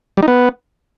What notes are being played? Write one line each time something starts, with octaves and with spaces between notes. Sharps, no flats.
G3
D#4
B3